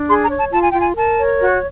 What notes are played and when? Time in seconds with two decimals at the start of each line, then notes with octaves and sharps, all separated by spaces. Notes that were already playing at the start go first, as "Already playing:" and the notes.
Already playing: D4
0.09 G#4 C6
0.23 A#5
0.30 C#5
0.38 A5
0.52 F4 A5
0.61 G#5
0.70 F4 G5
0.80 G#5
0.95 A#4 A5
1.18 C#5
1.39 F#4